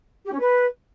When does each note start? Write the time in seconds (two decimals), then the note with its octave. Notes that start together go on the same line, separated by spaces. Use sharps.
0.25 G4
0.32 C#4
0.39 B4